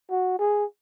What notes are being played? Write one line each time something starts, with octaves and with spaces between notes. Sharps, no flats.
F#4
G#4